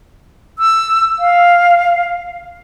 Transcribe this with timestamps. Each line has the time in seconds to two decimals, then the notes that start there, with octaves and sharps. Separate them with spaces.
0.59 E6
1.19 F5